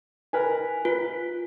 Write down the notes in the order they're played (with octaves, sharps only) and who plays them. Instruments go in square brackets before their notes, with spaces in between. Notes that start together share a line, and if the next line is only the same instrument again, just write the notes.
[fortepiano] A#4 B4 G#5
[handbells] F4 [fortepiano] B4